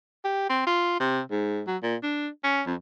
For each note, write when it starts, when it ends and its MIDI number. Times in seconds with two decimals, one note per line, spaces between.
0.24 0.47 67
0.49 0.62 60
0.66 0.96 65
1.00 1.21 48
1.31 1.62 44
1.67 1.77 54
1.83 1.96 46
2.03 2.28 62
2.44 2.61 61
2.67 2.75 41